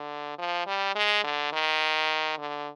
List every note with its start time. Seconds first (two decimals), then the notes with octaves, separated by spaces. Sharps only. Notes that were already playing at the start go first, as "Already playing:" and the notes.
Already playing: D3
0.39 F3
0.67 G3
0.95 G#3
1.24 D3
1.53 D#3
2.38 D3